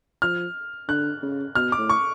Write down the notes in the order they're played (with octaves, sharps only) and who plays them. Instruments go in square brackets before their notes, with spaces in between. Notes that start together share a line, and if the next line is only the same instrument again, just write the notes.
[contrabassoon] F3 [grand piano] F6
[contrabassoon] D3 [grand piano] F#6
[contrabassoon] C#3
[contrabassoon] B2 [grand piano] F6
[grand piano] D6
[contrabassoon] A2
[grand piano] C#6